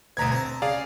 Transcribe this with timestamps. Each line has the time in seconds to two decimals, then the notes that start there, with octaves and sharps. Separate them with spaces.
0.17 G1 D2 B2 B4 A#5 G#6
0.32 C4 A5 A#5
0.62 C#3 G#4 D5 F5